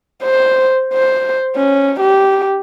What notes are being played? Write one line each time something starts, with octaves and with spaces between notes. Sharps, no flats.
C5
C5
C#4
G4